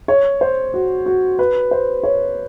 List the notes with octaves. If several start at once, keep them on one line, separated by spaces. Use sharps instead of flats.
C#5
C5
F#4
F#4
B4
C5
C#5